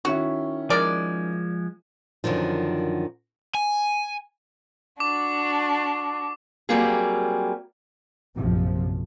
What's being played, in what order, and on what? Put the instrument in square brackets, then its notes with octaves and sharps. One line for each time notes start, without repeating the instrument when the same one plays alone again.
[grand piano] D#3 C#4 E4 [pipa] F#4
[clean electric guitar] F3 G#3 [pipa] A#4 D5
[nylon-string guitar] F#2 A2 D3 D#3 F3
[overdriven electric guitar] G#5
[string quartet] D4 F#4 [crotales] D6
[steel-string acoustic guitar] F#3 G3 A#3 C4 F4 G#4
[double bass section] A#1 F#2 C3 F3